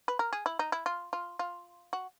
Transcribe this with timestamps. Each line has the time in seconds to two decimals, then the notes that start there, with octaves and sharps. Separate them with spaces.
0.08 B4
0.19 A#4
0.33 G#4
0.46 E4
0.59 D#4
0.72 E4
0.86 F4
1.13 F4
1.39 F4
1.93 F#4